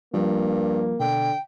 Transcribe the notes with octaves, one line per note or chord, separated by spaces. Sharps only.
G2 F3 G3 A#3 F4
B2 D3 G5